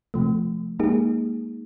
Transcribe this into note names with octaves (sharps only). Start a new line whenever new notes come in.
C3 F3 A3
G#3 A#3 D#4 G4 G#4